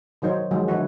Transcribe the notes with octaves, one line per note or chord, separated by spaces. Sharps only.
D#3 F#3 D#4 C5 C#5
D#3 F3 F#3 G#3
D3 E3 E4 F#4